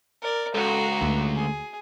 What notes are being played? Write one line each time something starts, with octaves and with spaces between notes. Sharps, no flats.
A#4 D5
C#2 F#4 A4 A#5
D2 D3 A3
G#4